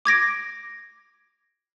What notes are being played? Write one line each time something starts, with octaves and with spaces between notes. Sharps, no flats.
D6 G#6 A#6 D7